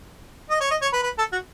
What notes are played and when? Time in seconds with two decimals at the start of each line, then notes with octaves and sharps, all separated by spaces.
0.50 D#5
0.61 C#5
0.71 D#5
0.82 C#5
0.93 B4
1.03 B4
1.18 A4
1.32 F#4